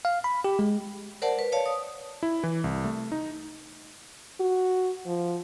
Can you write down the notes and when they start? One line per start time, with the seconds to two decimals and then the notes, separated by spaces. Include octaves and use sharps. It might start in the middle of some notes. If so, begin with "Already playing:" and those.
0.05 F5
0.24 B5
0.45 G4
0.59 G#3
1.22 A#4 C5 D5 F#5 A5
1.39 B4
1.52 C#5 D5 F5 A5
1.66 D#6
2.23 E4
2.43 E3
2.64 C2
2.84 A3
3.12 D#4
4.40 F#4
5.06 F3